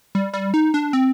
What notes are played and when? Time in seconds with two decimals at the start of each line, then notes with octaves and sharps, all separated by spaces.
0.15 G3
0.33 G3
0.54 D#4
0.74 D4
0.93 C4